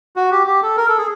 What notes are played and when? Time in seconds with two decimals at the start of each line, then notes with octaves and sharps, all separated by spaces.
0.16 F#4
0.31 G4
0.47 G4
0.63 A4
0.77 A#4
0.88 A4
0.98 G#4